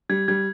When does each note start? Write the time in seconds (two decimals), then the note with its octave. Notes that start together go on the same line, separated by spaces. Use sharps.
0.09 G3 G#6
0.28 G3 G#6